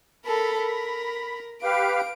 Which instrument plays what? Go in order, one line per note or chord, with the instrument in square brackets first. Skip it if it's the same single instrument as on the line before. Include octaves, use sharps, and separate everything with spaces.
[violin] A4 A#4 [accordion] B5
[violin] A#4
[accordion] G4 B4 F5 [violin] D7